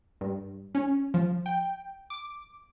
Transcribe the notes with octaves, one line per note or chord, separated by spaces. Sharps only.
G2
C#4
F3
G5
D6